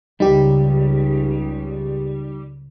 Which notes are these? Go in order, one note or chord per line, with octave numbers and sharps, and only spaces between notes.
C#2 C#3 G3 D#4 G4